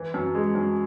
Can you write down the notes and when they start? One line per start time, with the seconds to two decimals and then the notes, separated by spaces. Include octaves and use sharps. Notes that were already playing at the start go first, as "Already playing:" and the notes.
Already playing: E3
0.14 F#2
0.35 G#3
0.55 F#2